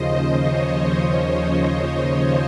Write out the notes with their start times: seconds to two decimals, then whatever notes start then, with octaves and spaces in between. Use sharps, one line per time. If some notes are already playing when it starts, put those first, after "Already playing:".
Already playing: D#2 C#3 F3 C5 D#5
0.36 C#5
0.98 C5 D#5